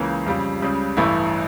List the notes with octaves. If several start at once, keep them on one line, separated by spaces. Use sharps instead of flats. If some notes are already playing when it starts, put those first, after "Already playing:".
Already playing: C#2 C#3 E3 A#3
F2 C#3 G3
C#2 C#3 G3
A1 G2 E3 A3 E4